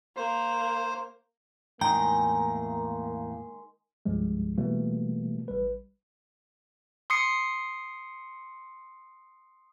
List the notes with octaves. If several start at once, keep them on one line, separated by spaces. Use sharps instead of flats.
A#3 C5
E2 A2 D#3 G#3 A#3 G#4 G5 A#5
C2 G2 F3 G3 G#3
B2 E3 G3 A3 A#3
A1 G3 B4
C6 D#6 C7 C#7